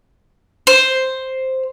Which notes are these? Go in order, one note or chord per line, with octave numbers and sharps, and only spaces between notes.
C5